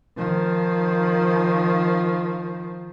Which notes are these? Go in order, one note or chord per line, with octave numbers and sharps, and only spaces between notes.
D#3 F3